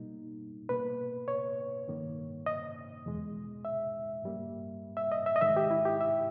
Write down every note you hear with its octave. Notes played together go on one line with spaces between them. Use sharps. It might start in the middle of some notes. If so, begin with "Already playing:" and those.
Already playing: B2 G3 A#3 D#4
B2 A#3 B4
C#5
G2 D#3 A#3
D#5
E2 B2 G#3
E5
G2 G3 A#3
E5
D#5
E5
D#5
G#2 D#3 G#3 E5
G4
E4
G4
E5